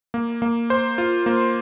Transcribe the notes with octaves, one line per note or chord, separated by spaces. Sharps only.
A#3
A#3
C5
F4
A#3